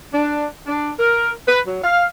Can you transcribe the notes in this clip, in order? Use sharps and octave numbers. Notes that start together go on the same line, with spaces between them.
D4
D4
A#4
B4
F#3
F5